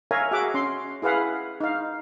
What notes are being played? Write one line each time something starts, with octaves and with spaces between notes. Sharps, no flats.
A#4 C#5 E5 F5 G#5 A#5
F#4 G#4 E5 F#5 D6
C#4 C6
E4 G#4 B4 F5 F#5 B5
D#4 F5